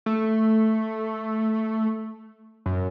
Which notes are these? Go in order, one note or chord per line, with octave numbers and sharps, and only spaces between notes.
A3
F#2